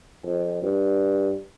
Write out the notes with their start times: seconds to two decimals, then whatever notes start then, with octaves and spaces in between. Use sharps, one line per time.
0.24 F2
0.62 G2